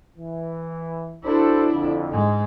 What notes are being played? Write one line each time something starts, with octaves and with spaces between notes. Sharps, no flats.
E3
D4 E4 F#4 A4 C5
F2 D3
G#2 G#3